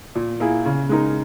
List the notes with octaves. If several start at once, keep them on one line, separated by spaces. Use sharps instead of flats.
A#2
A#3 E4 G#4
C#3
G#3 D#4 A#4